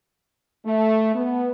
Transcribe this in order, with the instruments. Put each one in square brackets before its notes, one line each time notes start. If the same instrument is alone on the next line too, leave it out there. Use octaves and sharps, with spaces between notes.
[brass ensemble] A3
B3